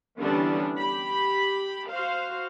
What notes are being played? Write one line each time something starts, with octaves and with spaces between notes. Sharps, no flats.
D3 E3 G3 B3 C#4 D4
G4 B5
F#4 C5 F5